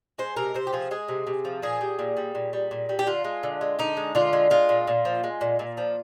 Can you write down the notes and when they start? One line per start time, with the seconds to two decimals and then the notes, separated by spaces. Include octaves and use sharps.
0.18 G#3 C5
0.37 C3 A#4
0.54 C3 C5
0.67 G4
0.73 F3 G#4
0.91 G#3 G#4
1.08 C3
1.27 C3
1.45 F3
1.62 A#2 G#4
1.81 G3
1.99 A#2
2.17 G3
2.35 A#2
2.53 G3
2.71 A#2
2.89 G3
2.99 G4
3.07 D3 F4
3.24 G#3
3.43 D3
3.61 G#3
3.79 D3 D#4
3.97 G#3
4.15 D3 F4
4.33 G#3
4.50 G#3 F4
4.69 A#2
4.87 A#2
5.05 F3
5.24 G#3
5.41 A#2
5.59 A#2
5.77 F3